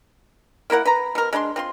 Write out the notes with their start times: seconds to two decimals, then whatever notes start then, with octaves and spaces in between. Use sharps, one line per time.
0.70 A#3 E4 A#4 F#5
0.85 B4 A#5
1.15 B2 A#4
1.33 G#3 D4 B5 C6
1.56 C4 F4 C6